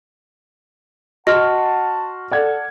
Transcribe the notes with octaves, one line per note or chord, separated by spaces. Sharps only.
F#4 D#5 F#5 A5 C6 F6
A4 D5 F#5 G#6